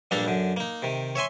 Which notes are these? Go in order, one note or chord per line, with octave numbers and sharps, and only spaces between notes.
A#1 G2 A#3 D4 A4 A#5
F#2 D3
A#3 D#4
C3 D#3
C#5 E5 G#5 C6